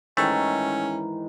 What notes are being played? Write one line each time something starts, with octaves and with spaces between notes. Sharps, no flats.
G#2 D#3 E3 A3 C#4